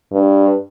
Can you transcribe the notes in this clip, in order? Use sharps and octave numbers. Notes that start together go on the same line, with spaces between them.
G2